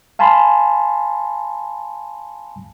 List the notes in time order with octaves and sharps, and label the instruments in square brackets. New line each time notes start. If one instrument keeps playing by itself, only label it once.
[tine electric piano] F5 G#5 A5 B5 C6